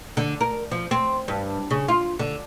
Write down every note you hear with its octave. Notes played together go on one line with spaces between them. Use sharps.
D3
A#4
F3
C4
G2
C#3
F4
D3